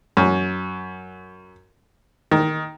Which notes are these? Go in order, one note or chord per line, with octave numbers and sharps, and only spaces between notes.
F#2
D#3